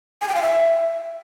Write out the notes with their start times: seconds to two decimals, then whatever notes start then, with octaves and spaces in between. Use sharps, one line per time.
0.21 G#5
0.28 G5
0.35 F5
0.42 E5